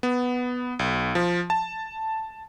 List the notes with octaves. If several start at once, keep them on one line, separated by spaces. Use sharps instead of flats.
B3
B1
F3
A5